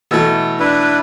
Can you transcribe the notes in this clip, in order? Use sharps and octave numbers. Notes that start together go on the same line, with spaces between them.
B2 E3 A3
D4 E4 B4